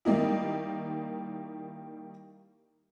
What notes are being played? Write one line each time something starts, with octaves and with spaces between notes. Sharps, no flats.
D#3 G3 A#3 D#4 E4